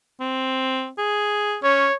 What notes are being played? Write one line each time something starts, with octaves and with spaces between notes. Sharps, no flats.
C4
G#4
C#4 C#5